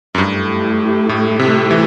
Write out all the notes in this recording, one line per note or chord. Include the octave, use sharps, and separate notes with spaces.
F#2
G2 A3 E4 G4
A2
C3
E3